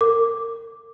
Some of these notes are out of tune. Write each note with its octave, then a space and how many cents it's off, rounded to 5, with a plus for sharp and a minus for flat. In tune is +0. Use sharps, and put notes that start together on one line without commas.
A#4 -35 D6 +0